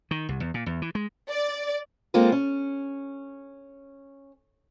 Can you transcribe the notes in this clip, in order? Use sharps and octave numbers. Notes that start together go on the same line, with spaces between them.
D#3
C2
E2
A#2
E2
E3
G#3
D5
G#3 A#3 C4 F4 A4
C#4